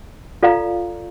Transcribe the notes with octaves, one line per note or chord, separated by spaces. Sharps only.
F4 A4 D5 F5 A#5